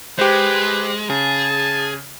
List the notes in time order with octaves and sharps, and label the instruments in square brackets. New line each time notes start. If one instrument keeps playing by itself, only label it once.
[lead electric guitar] G#3 [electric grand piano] G4 C5 [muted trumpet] B4
[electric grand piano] C#3 [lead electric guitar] G#4 [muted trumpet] A5